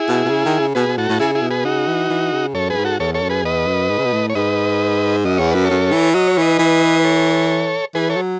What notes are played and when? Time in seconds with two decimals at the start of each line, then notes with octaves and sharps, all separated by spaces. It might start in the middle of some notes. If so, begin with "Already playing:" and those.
Already playing: E4 G#4
0.08 B2
0.25 B2
0.30 C#3
0.45 D#3
0.60 C#3
0.75 B2 G#4 B4
0.87 B2
0.98 A2 F#4 A4
1.09 A2
1.20 C#3 E4 G#4
1.35 E4 G#4
1.42 B2
1.50 G#4 B4
1.65 C#3 D#4 F#4
1.87 E3
2.10 E3
2.32 C#3
2.54 F#2 A4 C#5
2.70 F#2 G#4 B4
2.77 G#2
2.85 F#4 A4
3.00 E2 A4 C#5
3.14 A4 C#5
3.22 F#2
3.30 G#4 B4
3.44 E2 B4 D#5
3.67 F#2
3.90 G#2
3.98 C#3
4.06 B2
4.13 A2
4.30 C#5
4.35 G#2 B4 D#5
5.25 F#2 D#5
5.38 E2 C#5
5.51 F#2 B4
5.64 A4 C#5
5.70 F#2
5.92 E3
6.14 F#3 D#5
6.28 C#5
6.38 E3 B4 D#5
6.59 E3
6.99 B4
7.04 A4 C#5
7.95 E3 G#4 B4
8.10 A4 C#5
8.16 F#3